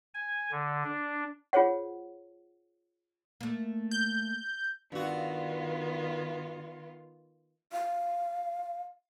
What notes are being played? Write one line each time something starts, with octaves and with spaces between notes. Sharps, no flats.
G#5
D3
D4
F4 G#4 C5 C#5 F#5
A3 A#3
G6
G2 D#3 B3 F4 F#4
F5